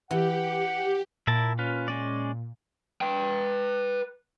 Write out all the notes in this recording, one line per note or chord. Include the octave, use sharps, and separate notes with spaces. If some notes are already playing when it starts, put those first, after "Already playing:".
E3 G4 F#5
A#2 E4 A#4 A5
C#4 F4 B4
G#3 C#4 D5
B4 G5